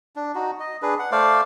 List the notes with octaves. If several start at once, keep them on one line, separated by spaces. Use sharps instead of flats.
D4
D#4 F#4
D#5
D4 G#4 B4
F#5
A3 C5 D5 F5